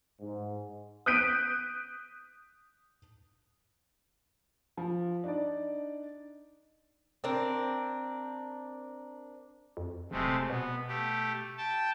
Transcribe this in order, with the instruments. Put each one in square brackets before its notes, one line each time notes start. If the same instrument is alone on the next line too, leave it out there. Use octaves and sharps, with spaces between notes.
[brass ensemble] G#2
[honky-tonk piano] D#6 F#6 G6 B6 D7 D#7
[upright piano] F3
D4 D#4 D5
[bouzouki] C4 D4 A#4
[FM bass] F2
[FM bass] D1 [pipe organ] C3 G#3 A3
[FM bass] B2 [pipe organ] B3
[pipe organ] A3 G4
G5 A5